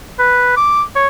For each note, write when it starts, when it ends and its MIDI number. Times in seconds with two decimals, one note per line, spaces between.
0.19 0.52 71
0.57 0.82 86
0.96 1.08 73